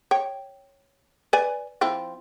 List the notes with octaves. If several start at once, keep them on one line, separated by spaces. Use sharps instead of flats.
C#5 G5
B4 D5 G#5
F3 C4 E4